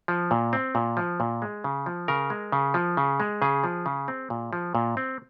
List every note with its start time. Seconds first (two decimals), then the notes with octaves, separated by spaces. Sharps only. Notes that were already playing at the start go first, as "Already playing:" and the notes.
0.08 F3
0.31 A#2
0.53 C4
0.75 A#2
0.97 F3
1.20 A#2
1.42 G#3
1.64 C#3
1.86 F3
2.08 C#3 A#4
2.30 G#3
2.52 C#3
2.74 F3
2.97 C#3
3.20 G#3
3.42 C#3 G#4
3.64 F3
3.86 C#3
4.08 C4
4.30 A#2
4.53 F3
4.75 A#2
4.97 C4